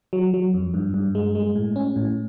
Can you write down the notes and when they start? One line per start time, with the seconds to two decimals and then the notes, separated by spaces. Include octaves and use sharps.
0.13 F#3
0.34 F#3
0.54 F2
0.74 G2
0.94 G2
1.15 G#3
1.35 G#3
1.55 A2
1.76 C#4
1.96 A2